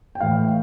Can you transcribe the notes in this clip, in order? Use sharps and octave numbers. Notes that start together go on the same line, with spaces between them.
G5
A2 E3 F5